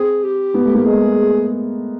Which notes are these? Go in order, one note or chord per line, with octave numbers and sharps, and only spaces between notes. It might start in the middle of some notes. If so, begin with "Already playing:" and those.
Already playing: C4 G#4
G4
B3
A3
A#3 G4
G#3 G#4